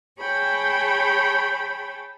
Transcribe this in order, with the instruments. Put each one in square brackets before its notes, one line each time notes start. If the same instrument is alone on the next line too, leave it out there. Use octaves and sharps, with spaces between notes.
[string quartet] G#4 C#5 G5 A5 B5